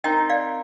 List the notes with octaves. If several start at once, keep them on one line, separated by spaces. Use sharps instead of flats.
C4 D#4 A#4 D#5 G5
D5 F5